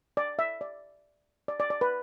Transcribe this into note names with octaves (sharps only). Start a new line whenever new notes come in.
D5
E5
D5
D5
D5
D5
B4